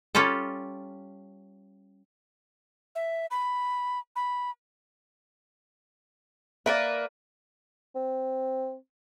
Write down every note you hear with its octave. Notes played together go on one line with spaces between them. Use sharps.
G3 C#4 F4 G4 A4
E5
B5
B5
A#3 A#4 B4 D5 E5
C4